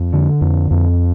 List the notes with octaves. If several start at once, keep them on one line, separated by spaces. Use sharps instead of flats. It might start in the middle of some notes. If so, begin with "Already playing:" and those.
Already playing: F2
D3
F2
F2